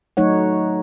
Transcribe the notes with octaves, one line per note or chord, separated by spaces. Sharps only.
F#3 A3 D#4 C#5 F#5